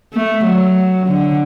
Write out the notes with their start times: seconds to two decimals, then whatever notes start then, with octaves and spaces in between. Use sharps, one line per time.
0.14 A3
0.45 F#3
1.08 D3